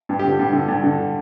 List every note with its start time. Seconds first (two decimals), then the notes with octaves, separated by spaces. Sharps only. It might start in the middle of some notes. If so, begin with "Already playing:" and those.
0.09 G2
0.19 G4
0.24 D3
0.39 G2
0.53 D3
0.68 G2
0.83 D3